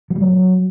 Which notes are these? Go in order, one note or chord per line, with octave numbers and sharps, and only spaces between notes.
F#3
G3
F#3